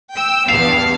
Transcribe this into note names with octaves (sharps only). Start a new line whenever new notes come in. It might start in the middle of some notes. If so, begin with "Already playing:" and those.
G5 E6
E2 G2 B3 F5